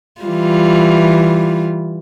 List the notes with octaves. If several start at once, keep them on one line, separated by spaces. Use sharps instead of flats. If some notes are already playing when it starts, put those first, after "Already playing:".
E3 G3 F4